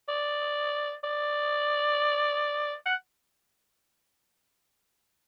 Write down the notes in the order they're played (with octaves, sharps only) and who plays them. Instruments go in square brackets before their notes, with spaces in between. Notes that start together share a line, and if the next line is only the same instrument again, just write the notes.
[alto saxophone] D5
D5
F#5